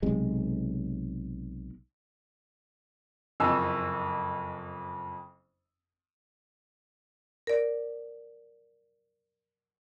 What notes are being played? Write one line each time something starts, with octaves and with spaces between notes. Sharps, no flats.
B1 C3 G#3
F#1 F2 G#5 E6
A#4 D5